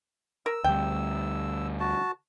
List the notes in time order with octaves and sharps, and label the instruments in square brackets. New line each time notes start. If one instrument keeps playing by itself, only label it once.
[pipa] A#4 [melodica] E6
[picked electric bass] D2 G3 [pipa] G5
[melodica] F#4 A5